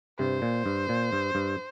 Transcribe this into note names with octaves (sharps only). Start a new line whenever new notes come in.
G2 C3 C5
A#2
G2
A#2
G2
G2